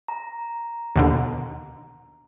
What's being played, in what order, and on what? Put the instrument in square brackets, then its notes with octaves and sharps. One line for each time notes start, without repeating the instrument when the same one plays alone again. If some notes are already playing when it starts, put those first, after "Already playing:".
[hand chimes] A#5
[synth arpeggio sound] D#2 B2 D3